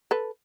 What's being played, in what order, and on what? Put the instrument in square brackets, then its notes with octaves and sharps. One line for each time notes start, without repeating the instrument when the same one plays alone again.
[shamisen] A4 B4